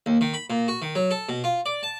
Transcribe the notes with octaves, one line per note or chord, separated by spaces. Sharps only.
D#2
D#3
B5
A#2
F#4
D#3
F#3
A4
B2
F4
D5
A5